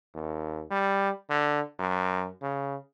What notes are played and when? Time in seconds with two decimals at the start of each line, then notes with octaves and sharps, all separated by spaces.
0.15 D#2
0.71 G3
1.30 D3
1.80 F#2
2.42 C#3